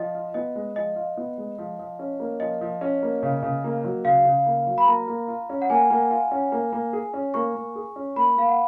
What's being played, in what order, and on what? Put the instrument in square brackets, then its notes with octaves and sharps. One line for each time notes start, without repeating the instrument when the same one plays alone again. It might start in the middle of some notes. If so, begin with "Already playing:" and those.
Already playing: [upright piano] F3 [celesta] D#5
[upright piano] F4
[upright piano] B3 [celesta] D#5
[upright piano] G#3
[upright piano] F3 [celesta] D#5
[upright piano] F4
B3
G#3
F3
F3
C#4
A#3
[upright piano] F3 [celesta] D#5
[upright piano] F3
C#4
A#3
C#3
C#3
A#3
F#3
[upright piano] C#3 [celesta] F5
[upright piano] C#3
A#3
F#3
[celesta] B5
[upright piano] A#3 [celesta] A#5
[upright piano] A#3
F4
C#4
[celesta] F#5
[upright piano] A#3 [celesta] G#5
[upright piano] A#3
F4
C#4
A#3
A#3
G#4
C#4
[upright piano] A#3 [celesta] C#6
[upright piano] A#3
G#4
C#4
[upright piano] A#3 [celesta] B5
[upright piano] A#3 [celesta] F5
[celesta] F#5